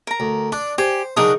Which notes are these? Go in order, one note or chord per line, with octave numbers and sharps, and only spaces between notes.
A#4 A#5
D2
D4 D5
G4 C5 G#5
C#3 F#3 D4 D#4 A#4 D#6